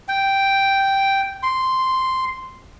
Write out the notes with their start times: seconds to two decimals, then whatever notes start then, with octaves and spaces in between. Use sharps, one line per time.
0.08 G5
1.43 C6